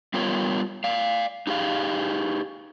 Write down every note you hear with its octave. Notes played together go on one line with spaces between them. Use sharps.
G3 B3 F4 A#4 C#5
D5 F5
D#4 G4 G#4 F5